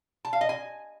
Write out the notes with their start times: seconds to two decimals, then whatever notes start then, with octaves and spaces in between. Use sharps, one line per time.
0.25 A5
0.33 F5
0.41 D#5
0.49 G#5